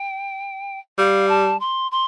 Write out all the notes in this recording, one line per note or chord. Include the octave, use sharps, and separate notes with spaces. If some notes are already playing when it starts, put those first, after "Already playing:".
Already playing: G5
G3 F5
A5
C6
C6